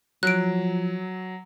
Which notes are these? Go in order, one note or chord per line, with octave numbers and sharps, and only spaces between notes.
F3 F#3 F#6 D7